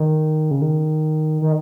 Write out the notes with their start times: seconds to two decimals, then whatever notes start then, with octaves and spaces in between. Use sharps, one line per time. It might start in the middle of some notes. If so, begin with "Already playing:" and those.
Already playing: D#3
0.51 C#3
0.62 D#3
1.42 D#3